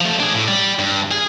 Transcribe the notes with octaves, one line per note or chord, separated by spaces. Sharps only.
F3 A3
D4 G#4
A2
G3
G2
G#4